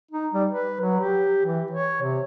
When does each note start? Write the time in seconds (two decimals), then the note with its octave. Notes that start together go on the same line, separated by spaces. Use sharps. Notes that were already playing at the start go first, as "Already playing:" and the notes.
0.12 D#4
0.34 G3
0.50 B4
0.81 F#3
1.00 G4
1.46 E3
1.71 C#5
2.02 C3